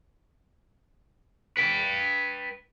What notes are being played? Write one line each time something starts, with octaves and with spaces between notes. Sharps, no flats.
B4 G5